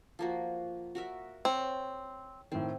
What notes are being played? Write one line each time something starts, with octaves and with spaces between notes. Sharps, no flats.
F3 A#3 F#4
F#4 A#4 E5
C4 C#5
A2 D#3 C4